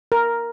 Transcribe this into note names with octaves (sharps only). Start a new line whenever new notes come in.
A#4